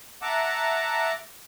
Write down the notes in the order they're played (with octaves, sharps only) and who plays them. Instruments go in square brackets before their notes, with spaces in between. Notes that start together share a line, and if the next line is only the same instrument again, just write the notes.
[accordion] E5 F#5 A5 A#5 D6